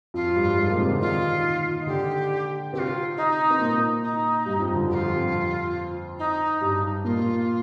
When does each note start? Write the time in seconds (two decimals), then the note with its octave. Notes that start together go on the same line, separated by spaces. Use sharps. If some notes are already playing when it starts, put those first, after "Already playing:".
0.14 F2 F3 F4
0.36 G2 G3
0.49 G3
0.58 G#2 G#3
0.68 A#2 A#3
0.79 C3 C4
0.90 D3 D4
1.00 D#3 D#4 F4
1.80 D#4
1.86 D3 D4 G4
2.73 C3 C4 G4
2.78 F4
3.16 D#4
3.51 C4
3.60 A#2 A#3
4.03 D#4
4.46 G2 G3
4.60 F2 F3
4.75 D3
4.89 F3 G4
4.94 F4
5.03 G3
5.16 F2 F3
6.18 D#4
6.61 G2 G3
7.04 A#2 A#3 F4